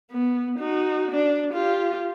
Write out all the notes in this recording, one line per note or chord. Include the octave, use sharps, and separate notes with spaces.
B3
D#4 F#4
D4
F4 G4